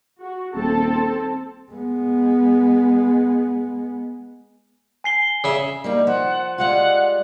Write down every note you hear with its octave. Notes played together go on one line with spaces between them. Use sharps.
F#4
D#1 C4 A4 A5
G#3 B3
G#5 C7 G7
C#3 E5
G3 A#3 D#4
F3 F#5
G3 G#3 F4 F#5